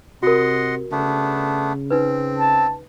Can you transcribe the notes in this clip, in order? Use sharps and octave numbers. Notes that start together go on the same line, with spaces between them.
C3 F#4 A#4 D#5 F#5 C6
C#3 A3 B3 D4
C4 D#4 B4
A5